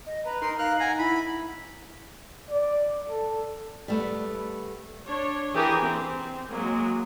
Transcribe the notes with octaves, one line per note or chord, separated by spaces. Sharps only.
D#5
B4 A#5
D#4 A#4 C6
A#4 F5 F6 F#6
F#5 G#5 A#5
E4 B5
D5
A4
G3 A3 B3
D4 C#5
E3 G4 G#4 A#4
C4
F#3 G#3 A#3